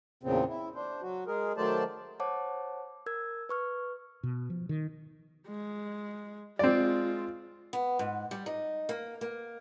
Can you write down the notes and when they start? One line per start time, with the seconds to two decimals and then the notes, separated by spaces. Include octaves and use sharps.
0.23 E2 A#2 C#3 C4
0.49 E4
0.75 D4 C5
1.02 F#3 F#4
1.27 G#3 G#4 A#4
1.57 D#3 F#3 A3 C5 D5 A5
2.20 C5 C#5 F#5 A5 D6
3.06 A#4 E6 G#6
3.49 B4 C#6 F6
4.23 B2
4.50 F3
4.69 D#3
5.48 G#3
6.59 G#3 C4 F4 D5
7.73 B3
7.99 G#2
8.31 G3
8.46 D#4
8.89 A#3
9.21 A#3